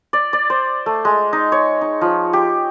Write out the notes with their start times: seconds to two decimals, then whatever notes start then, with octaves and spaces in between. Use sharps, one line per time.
0.13 D5
0.33 D5
0.50 C5
0.86 A3
1.05 G#3
1.33 D#4
1.52 C#5
1.81 D#4
2.01 F3
2.33 G4